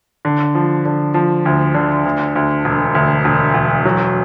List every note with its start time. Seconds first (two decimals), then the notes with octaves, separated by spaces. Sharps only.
0.25 D3
0.55 F3
0.85 D3
1.14 F3
1.45 D2
1.74 D3
2.05 D2
2.35 D2
2.65 E1
2.95 D2
3.25 E1
3.54 E1
3.85 F#3